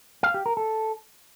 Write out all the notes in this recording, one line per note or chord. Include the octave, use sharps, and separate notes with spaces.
F5
G4
A#4
A4